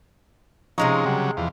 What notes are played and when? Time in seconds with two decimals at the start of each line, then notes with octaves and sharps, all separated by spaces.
0.78 C3 F3 G#3 C#4 D#4 A#5
1.06 C#3 F#3 G3
1.37 E2 F3